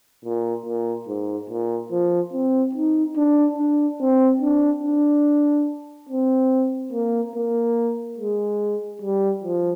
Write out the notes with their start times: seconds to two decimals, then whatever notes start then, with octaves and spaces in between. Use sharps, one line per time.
0.25 A#2
0.66 A#2
1.07 G#2
1.49 A#2
1.91 F3
2.33 C4
2.75 D#4
3.17 D4
3.58 D4
4.00 C4
4.41 D4
4.83 D4
6.09 C4
6.92 A#3
7.35 A#3
8.18 G#3
9.02 G3
9.44 F3